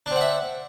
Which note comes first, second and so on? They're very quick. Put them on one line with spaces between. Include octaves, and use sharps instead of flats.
D4 C4 F#5 E5